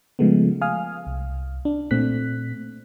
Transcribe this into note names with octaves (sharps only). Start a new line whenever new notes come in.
C#3 F3 G#3 A3 B3
F5 G#5 D#6 F6
C2
D4
A#2 A3 C4 F#6 B6